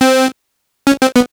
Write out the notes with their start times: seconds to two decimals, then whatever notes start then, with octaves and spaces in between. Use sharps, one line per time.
0.01 C4
0.87 C#4
1.02 C4
1.16 B3